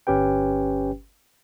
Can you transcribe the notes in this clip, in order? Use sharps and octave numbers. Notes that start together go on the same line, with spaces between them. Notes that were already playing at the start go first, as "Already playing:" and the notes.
G1 C#4 G4 B4 G5